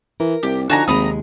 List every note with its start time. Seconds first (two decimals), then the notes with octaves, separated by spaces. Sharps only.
0.20 E3 A#4
0.43 C2 G4
0.70 D3 F3 D#4 F#4 G#5 A#5
0.88 G#1 D#2 C3 G#3 A#5 B5 D#6